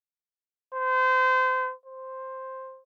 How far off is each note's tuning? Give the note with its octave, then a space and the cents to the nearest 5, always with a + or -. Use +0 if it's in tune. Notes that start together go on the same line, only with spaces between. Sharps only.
C5 -30
C5 +5